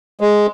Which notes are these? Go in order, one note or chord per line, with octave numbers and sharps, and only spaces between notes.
G#3